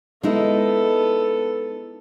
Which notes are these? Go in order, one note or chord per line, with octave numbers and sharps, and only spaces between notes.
G#3 B3 D#4 E4 A4